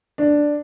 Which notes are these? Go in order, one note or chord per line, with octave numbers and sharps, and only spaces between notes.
D4